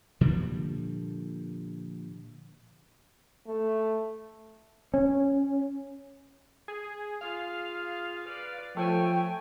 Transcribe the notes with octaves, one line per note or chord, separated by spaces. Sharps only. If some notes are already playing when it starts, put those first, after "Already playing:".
A#2 D3 F3 G3
A3
C#4
G#4
F4 G#4 F5
B4 D5
F3 A3 C#5 G5 G#5